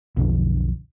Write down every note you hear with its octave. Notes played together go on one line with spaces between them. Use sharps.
B1 F2 D3